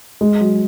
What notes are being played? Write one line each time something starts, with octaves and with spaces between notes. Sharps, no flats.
G#3
F#3